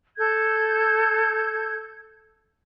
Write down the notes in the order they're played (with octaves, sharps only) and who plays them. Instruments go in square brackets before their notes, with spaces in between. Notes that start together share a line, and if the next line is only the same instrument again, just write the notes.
[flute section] A4 G6 G#6